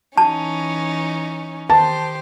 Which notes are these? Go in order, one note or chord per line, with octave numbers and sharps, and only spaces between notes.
E3 C#4 D#4 A5
D#3 G4 C5 A5